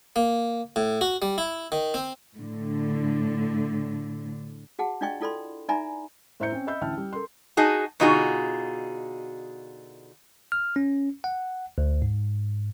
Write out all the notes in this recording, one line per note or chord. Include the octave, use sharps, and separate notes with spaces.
A#3
A2
F#4
G3
E4
D#3
C4
A2 D3
F#4 G#4 F#5 A5
D4 F4 D5 D#5 G5 C#6
E4 F4 A4 D5 B5 C6
D#4 D5 E5 G#5 A#5 B5
A2 C5 E5 A#5 G6 C#7
C4 C#4
D#5 E5 B5 E6 G6
A1 D2 E4 G5 A5 F6
G3
A4 A#4 C6
D#4 F#4 G#4 A5
B2 D3 D#4 F4 F#4 G#4
F6
C#4
F#5
D2
G#2